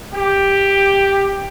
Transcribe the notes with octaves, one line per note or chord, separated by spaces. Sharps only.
G4